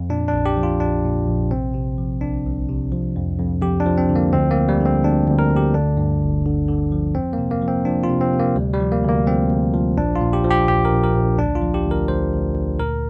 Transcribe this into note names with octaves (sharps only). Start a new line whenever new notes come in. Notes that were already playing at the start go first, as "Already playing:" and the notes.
Already playing: F2
A#2 D4
D4
A#1
G4
F3
F4
A#1 D4
A#2
A#1
C3 C4
C3
F3
C2 D4
C2
C3
F3
F2
F2
F2 G4
D4
F3
C4
D3
A#3
D2 C4
A#3
D2
G3
D3
C4
D2 D4
D2
A#4
D2
G4
D3 D4
G2
G1
D3
D3
F3
F2 C4
A#3
C3
A#3
F3
C4
F3 D4
F4
C3
C4
C3
A#3
D2 G3
G3
F3
A#3
D2
A#3
F3 C4
D2
F3
A#1 D4
F4
A#2
G4
F3
G4
A#1 G4
A#4
A#1
A#4
A#1
D2 D4
F4
F3
G4
D2
A#4
D2 C5
D2
D2
A#2 A#4